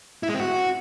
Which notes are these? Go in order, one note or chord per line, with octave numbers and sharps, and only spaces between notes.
E4
G#3
C4
F#4